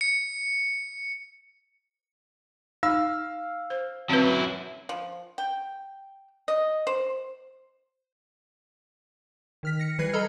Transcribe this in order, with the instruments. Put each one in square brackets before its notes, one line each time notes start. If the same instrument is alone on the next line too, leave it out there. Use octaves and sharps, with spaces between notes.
[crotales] C#7
[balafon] D#4 [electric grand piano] F5 E6
[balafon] C5
[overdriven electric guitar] F#3 E4 [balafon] C4 C#4 B4
[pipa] F3
G5
D#5
C5
[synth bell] D#3 F6 B6
A#6 C#7
E3 G3 B4 F#6 G#6 C7
A4 D#5 A#5 B5 E6 F6